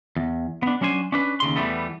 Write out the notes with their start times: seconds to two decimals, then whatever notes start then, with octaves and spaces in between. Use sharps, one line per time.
0.16 E2
0.63 B3 D4
0.81 F#3 C#4 D4 C5 G#5
1.12 C#4 D4 B4
1.40 D#2 C#3 C6
1.56 E2 E3 G3 A3 B3